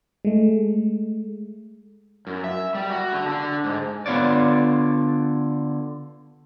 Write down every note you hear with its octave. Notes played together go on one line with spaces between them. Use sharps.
G#3 A3
F#2
E5
G3
F#4
D3
D3
G#2
D3 B3 F4 C#5 D5